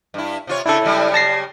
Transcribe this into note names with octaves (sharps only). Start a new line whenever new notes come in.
G2 E4
C3 F4 C#5
C#3 D4 E4 A4
C#3 F#3 G3
A5 A#6 C7